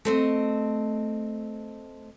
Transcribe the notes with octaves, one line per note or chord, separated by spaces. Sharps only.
A3 C4 D#5